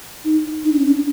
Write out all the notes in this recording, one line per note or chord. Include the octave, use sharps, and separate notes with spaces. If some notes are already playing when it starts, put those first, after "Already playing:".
D#4
D#4
D4
C#4
D4